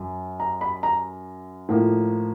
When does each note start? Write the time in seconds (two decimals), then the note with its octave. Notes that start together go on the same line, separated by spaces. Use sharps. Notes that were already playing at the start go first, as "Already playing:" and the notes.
Already playing: F#2
0.40 A#5
0.61 B5
0.83 A#5
1.69 A2 F3 A#3